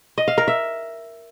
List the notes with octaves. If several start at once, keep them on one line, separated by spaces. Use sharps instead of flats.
D#5
F5
A#4
E5